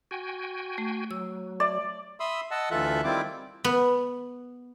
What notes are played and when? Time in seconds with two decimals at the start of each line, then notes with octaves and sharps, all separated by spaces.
0.11 F#4 G5 G#5
0.78 A3
1.11 F#3 E6
1.60 D5 E5
2.20 E5 B5 C6 D#6 E6
2.51 D#5 F#5 A5 E6
2.71 D2 E3 F4 A4 E5 F#6
3.04 D#3 G3 C4 E4 F4 D6
3.64 B3